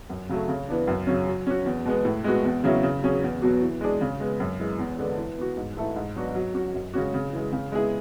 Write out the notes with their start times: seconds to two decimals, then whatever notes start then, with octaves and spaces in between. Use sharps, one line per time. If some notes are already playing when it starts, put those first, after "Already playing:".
0.10 F#2
0.29 C#3 F#3 A3
0.48 C#3
0.69 E3 B3 D4
0.87 F#2
1.07 C#3 F#3 C#4
1.27 F#3
1.47 C#4 F#4
1.66 E2
1.85 B2 G#3 B3
2.05 A2
2.24 G#3 B3 F#4
2.45 E2
2.64 C#3 F#3 C#4 E4
2.83 C#3
3.03 F#3 C#4 G#4
3.22 E2
3.42 B2 F#3 B3 F#4
3.62 E3
3.81 G#3 D4 G#4
4.01 C#3
4.20 G#3 B3
4.40 F#2
4.59 E3 G#3
4.79 E2
4.98 D3 G#3 B3 D4
5.18 E3
5.37 B3 F#4
5.57 G#2
5.76 E3 A3 E4 A4
5.96 G#2
6.16 F#3 B3 D4 F#4
6.35 F#3
6.54 C#4 F#4
6.74 F#2
6.94 C#3 G#3 C#4 F#4
7.14 C#3
7.33 E3 G#3
7.52 C#3
7.72 G#3 B3 E4 G#4